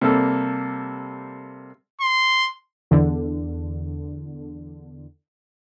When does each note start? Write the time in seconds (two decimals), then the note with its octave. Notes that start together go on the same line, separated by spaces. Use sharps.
0.01 C3 G3 A#3 A4
2.01 C6
2.91 E2 D3